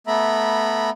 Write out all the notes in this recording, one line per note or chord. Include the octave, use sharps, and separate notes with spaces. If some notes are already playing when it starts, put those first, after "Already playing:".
A3 B3 E5 A#5 B5